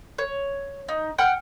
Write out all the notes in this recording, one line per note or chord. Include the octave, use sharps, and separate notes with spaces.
C#5
D#4
F#5 G5 F6